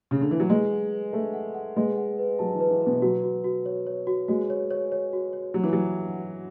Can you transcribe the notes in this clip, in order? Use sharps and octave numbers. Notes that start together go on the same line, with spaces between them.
C#3
D3
E3
F#3
G#3 B4
F#5
B4
A3 B4
F#5
F#5
G#3 B4
F#5
B4
F#3 A5
E3
B4
E3
B2 B4
F#3 F#4
F#4
F#4
C#5
C#5
F#4
G#3 F#4
C#5
C#5
C#5
F#4
C#5
F#3 C#5
E3
F#3 D4
F#5
F#4